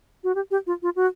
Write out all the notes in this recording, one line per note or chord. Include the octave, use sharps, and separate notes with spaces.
F#4
G4
G4
F4
F4
F#4